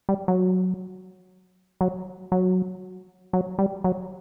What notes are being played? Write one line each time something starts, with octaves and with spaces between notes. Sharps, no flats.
G3
F#3
F#3
F#3
F#3
G3
F#3